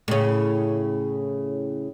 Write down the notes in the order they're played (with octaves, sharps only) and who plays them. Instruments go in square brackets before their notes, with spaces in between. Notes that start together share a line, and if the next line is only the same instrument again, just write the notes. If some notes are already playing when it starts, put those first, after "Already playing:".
[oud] A2 C#3